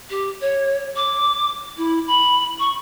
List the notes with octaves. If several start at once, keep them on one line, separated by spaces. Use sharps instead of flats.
G4
C#5
D6
E4
B5
C#6